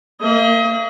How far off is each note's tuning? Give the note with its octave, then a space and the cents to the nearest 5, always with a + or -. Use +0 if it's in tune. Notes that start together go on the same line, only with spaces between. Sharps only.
A#3 -35 D#5 +35